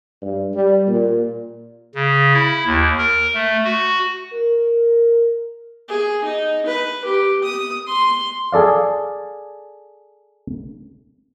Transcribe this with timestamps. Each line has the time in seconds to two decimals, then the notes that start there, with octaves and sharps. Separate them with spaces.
0.22 G2
0.54 G3
0.88 A#2
1.95 C#3
2.33 E4
2.66 D#2
2.98 A#4
3.34 A3
3.65 F#4
4.33 A#4
5.89 G#4
6.25 D#4
6.67 B4
7.05 G4
7.43 D#6
7.87 C6
8.52 G#4 A4 D5 F5